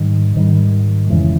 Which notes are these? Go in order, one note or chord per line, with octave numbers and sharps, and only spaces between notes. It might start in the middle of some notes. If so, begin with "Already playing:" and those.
Already playing: G#2 D#3 G3
G#2 D#3 G3
F2 C#3 E3 G#3